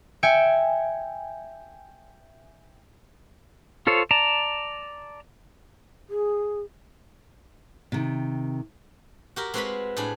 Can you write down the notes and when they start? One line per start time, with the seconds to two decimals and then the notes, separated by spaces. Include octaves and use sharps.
0.23 E5 G5 G#5 E6 C#7 D7
3.87 F4 A4 C5 C#5
4.11 D5 A5 A#5
6.10 G#4
7.92 C3 D#3
9.36 F#4 G4 A#4
9.54 G#3 C4 F#4 B4 F5 B5
9.97 A2 D4 G#4 B5